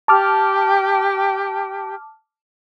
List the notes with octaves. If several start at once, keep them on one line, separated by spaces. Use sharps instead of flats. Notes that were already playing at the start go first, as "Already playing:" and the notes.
G4 G5 A5 D6 F6